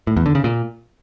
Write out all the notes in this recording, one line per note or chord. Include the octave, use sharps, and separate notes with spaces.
A2
E2
D3
C#3
A#2